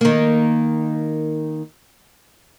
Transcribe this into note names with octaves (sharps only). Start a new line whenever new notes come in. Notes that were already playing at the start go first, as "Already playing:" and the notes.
D#3 A#3